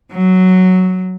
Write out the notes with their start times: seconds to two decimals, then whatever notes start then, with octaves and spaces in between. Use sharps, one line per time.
0.12 F#3